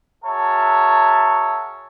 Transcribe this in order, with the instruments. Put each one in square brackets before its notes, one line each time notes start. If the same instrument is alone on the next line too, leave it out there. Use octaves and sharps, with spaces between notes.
[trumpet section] F#4 G#4 A#4 C#5 E5 A5